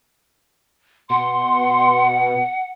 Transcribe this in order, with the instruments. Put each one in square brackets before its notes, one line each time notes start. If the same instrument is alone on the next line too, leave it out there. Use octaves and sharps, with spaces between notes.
[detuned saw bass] B2 [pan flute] F#5 [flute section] C6